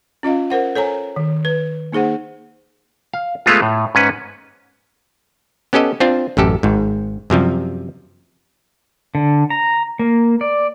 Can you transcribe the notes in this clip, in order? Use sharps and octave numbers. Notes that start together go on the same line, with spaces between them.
C#4 F4 D#5 F5
A#4 C5 F#5
A4 C#5 G#5 A#5
D#3
B4
A#3 D#4 G#4 C5 F#5
F5
G#3 A3 B3 F4
A2
G#2 C#4 B4
B3 C#4 G4 A4 D#5
C4 D4 F4 C5
A1 F#2 G4 A4
G#1 G#2
F#2 C3 F3 G3
D3
A#5
A#3
D5